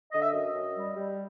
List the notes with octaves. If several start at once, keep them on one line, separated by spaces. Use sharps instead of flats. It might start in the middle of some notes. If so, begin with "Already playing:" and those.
D3 D#5
E5
F#2 D#5
F#2
G3
G3